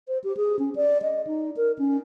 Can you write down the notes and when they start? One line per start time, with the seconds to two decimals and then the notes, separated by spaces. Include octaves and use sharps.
0.08 C5
0.24 G4
0.37 G#4
0.59 C#4
0.76 D5
1.02 D#5
1.27 D#4
1.57 A#4
1.79 C#4